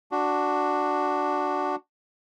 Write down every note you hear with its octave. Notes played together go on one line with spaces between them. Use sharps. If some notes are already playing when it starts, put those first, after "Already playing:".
D4 F#4